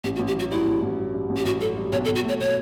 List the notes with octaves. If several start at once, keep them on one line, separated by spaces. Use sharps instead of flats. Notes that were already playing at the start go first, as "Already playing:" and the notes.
A1 G4
F#4
A1
G4
F#3 F#4
G2 E4
A1
A1
F#3
G2
A1
G4
A1 F#4
F#3 A4
G2
B1 C#5
A4
B1
F#4
A3 C#5
B2 C#5